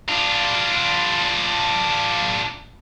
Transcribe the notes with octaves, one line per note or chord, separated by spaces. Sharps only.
D4 F4